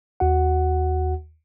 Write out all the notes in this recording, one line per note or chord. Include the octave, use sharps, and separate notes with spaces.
D#2 F#4 F#5